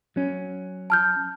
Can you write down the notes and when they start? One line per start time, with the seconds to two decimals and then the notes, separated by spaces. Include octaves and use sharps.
0.16 F#3 C#4
0.90 A5 F6 G6